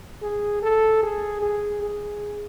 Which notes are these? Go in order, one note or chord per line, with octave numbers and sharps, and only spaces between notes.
G#4
A4
G#4
G#4
G#4